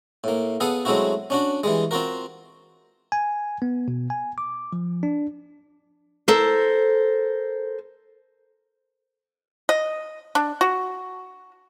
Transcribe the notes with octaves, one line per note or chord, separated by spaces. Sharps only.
A2 A#3
B3 G#4 A4 F5 F#5 G#5
F#3 G#3 A3 C4 E4 F#4
C#4 D4 F#4
E3 G3 G#3
C4 F4 F#4 A#4
G#5
B3
B2
G#5
D6
F3
D4
A4 A#4 C5
D#5
D4
F#4